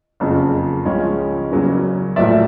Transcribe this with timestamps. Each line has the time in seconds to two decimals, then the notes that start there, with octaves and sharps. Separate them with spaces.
0.20 F#1 F2 C#3
0.85 C#2 C#3 F3 G#3 C#4
1.51 E2 C#3 F#3 A#3 C#4
2.16 A#1 A2 F#3 A#3 D5 E5